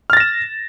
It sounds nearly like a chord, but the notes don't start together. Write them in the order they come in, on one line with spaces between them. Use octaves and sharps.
F6 A6 A#6 E7